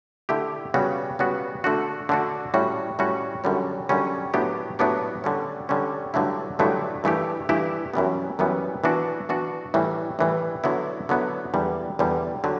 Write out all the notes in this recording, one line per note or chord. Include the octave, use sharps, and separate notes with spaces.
D3 A3 E4 G4
C#3 G3 B3 F#4
C#3 G3 B3 F#4
D3 A3 D4 F#4
D3 A3 D4 F#4
A2 G3 C#4 F#4
A2 G3 C#4 F#4
F#2 D3 G3 C#4
F#2 D3 G3 C#4
A2 F#3 B3 D4 G4
A2 F#3 B3 D4 G4
D3 G3 C#4
D3 G3 C#4
G2 D3 F#3 A3 E4
G2 D3 F#3 A3 E4
G2 E3 A3 E4 G4
G2 E3 A3 E4 G4
F#2 E3 G3 B3
F#2 E3 G3 B3
E3 B3 D4 F#4
E3 B3 D4 F#4
A2 E3 G3
A2 E3 G3
D3 F#3 B3 E4
D3 F#3 B3 E4
E2 D3 G3
E2 D3 G3
D3 F#3 G4